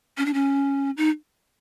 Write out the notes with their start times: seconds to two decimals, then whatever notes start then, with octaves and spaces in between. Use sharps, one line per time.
0.18 C#4
0.26 D4
0.34 C#4
0.97 D#4